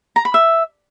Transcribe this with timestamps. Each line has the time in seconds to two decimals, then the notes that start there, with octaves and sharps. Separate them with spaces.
0.16 A#5
0.25 B5
0.34 E5